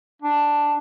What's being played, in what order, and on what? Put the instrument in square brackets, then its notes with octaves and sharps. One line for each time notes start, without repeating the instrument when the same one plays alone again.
[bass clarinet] D4